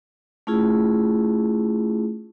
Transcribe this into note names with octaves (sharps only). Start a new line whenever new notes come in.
A3 C#4 E4 F4 G#4